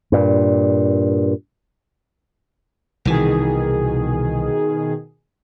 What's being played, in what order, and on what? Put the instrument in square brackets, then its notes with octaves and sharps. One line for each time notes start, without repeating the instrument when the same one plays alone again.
[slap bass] G2 A#2
[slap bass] C2 E3 [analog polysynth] B2 D#3 G#4